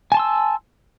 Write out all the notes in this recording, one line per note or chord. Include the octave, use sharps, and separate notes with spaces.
G#5 A5 C6 E6